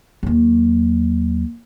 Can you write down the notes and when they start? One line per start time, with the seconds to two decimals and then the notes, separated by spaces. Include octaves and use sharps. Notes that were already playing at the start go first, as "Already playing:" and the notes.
0.23 D#2 F#3